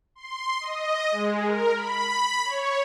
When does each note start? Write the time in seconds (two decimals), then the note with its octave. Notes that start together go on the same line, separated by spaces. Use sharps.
0.15 C6
0.60 D#5
1.11 G#3
1.45 A#4
1.75 B5
2.45 C#5